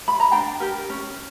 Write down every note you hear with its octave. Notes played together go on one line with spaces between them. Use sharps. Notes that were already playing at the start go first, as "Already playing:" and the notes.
B5
A#5
D4 G5
G4 A#4
C#4